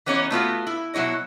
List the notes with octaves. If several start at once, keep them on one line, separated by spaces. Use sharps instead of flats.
E3 B3 C#4 D#4 C#5
A3 B3 F4 F#4
E4
B2 F#3 E4 C#5 D#5